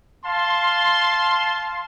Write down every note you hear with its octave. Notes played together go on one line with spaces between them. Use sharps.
F5 A5 C6